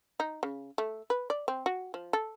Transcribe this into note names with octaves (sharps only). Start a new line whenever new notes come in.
D#4
C#3
A3
B4
D5
C4
F#4
F3
A4